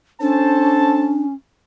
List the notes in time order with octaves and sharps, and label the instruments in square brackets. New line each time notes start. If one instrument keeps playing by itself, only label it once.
[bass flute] C#4 [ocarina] D4 [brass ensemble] A4 C5 A5